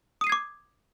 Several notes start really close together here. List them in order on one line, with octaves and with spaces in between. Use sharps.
D#6 D#7 C7 G#6 D6